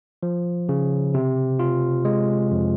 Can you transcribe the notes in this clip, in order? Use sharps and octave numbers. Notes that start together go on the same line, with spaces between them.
F3
C#3
C3
F4
G#3
F2